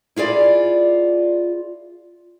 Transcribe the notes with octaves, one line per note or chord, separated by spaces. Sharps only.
E4 F4 G#4 D5